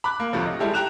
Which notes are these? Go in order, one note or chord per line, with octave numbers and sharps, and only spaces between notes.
B5 D6 F#6
A#3
D2 A2 C3 F3 C4
D#5
G3 G#3 E4 G4 A4
G5 A#5 F#6 E7 F7